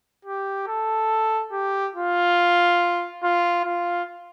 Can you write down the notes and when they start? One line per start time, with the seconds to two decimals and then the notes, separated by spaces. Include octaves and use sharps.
0.25 G4
0.67 A4
1.52 G4
1.95 F4
3.23 F4
3.65 F4